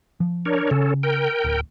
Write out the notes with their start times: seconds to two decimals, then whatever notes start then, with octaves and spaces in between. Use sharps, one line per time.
0.20 F3
0.45 D4 A#4 C#5
0.71 C#3 C#4 A4
1.03 A#4 G5
1.44 D1